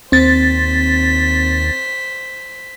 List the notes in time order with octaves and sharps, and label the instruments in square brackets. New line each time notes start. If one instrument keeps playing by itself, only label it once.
[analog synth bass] D#2 [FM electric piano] C4 A6 [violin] C5 B6